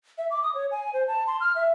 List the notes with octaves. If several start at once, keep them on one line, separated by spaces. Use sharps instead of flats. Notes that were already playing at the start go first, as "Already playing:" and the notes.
E5
D6
D#6
C#5
G#5
C5
A5
C6
F6
E5